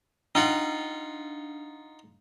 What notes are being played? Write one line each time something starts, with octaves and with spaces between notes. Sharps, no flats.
D4 D#4 F4 F#5